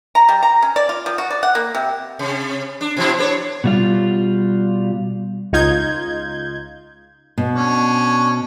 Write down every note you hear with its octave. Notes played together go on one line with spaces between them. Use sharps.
A#5
G3
A#5
C#4
D5
F4
F3
F#4
D5
F#5
A#3
C3
C3
D4
B2 F3 E4
D4 A#4 C#5
B2 G3 F4
C#2 D#4 F4 G6 G#6
B2
C#4 D4